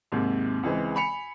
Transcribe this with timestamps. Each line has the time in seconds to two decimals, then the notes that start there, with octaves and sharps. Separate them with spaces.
0.12 D#2 G#2 C3
0.63 C#2 E3 G#3 C4
0.95 G#5 B5 C#7 F7